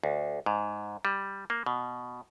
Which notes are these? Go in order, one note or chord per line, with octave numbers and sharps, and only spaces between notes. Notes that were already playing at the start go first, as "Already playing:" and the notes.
D2
G#2
G3
A#3
B2